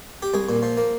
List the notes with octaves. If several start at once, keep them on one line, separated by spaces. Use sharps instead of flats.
G4
C2 G#4
A#2
F3
A#3